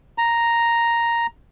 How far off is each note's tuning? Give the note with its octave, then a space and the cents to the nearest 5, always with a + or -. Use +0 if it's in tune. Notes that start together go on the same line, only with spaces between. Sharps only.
A#5 +0